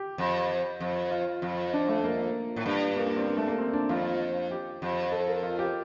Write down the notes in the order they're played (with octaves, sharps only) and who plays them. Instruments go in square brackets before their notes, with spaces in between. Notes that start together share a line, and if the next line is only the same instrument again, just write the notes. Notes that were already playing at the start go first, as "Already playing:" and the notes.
Already playing: [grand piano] G4
[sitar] F2
F2
[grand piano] F4
[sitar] F2
[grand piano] D4
A3
A#3
[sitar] A2
G2
[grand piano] A#3
A#3
C4
A#3
A3
A#3
C4
D4
[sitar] F2 [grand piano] F4
[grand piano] G4
[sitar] F2
[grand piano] A4
A#4
F4
G4